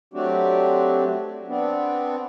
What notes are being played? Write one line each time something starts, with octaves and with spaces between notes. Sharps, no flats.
F#3 A3 C4 D4 F#4 G4
B3 C4 D4